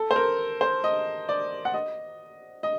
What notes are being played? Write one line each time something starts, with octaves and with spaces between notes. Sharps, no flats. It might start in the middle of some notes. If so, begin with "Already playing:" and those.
Already playing: A4
C5
A#4
C5
D#5
D5
F#5
D#5
D#5